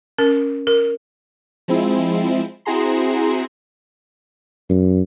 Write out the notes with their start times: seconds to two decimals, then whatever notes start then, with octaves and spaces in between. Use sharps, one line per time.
0.18 C#4 A#4
0.67 A#4
1.68 F3 G#3 C4 E4
2.65 C4 E4 F#4 G#4 A#5 C6
4.69 F#2